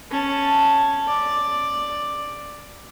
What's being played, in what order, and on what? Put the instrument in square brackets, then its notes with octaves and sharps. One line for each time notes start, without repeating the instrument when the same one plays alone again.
[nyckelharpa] C#4 A5
D5